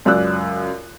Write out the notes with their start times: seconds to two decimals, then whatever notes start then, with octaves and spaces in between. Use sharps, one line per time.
0.05 C#2 F#2 D5 E6 F#6